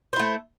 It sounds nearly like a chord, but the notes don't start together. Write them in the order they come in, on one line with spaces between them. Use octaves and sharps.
C5 E4 A3